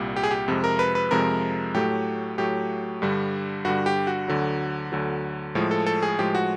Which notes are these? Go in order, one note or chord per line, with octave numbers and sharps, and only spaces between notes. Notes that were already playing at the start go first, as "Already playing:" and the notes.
Already playing: C2 A#2 G3
G4
G#4
G4
F2 C3 F3 G#3
A#4
B4
B4
F2 C3 F3 G#3 A#4
A2 F#3 A3 G4
A2 F#3 A3 G4
G2 D3 G3
G2 D3 G3 F#4
G4
F#4
D2 D3 F#3
D2 D3 F#3
A2 F3 G#3
A4
A4
G#4
A2 F3 G#3 G4
F#4